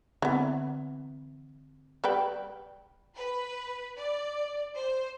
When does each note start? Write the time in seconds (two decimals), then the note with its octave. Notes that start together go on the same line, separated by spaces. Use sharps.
0.22 D3 E3 B3 C4
2.04 G3 B4 G5
3.16 B4
3.98 D5
4.76 C5